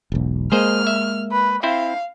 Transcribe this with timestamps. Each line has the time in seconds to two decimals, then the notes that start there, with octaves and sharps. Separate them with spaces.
0.12 E1 B1
0.52 G#3 A#3 G#4 C5 D#5 F6
0.87 E5
1.32 B4
1.63 C4 E4 C5 F5